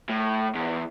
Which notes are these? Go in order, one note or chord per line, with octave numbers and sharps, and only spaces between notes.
A2
E2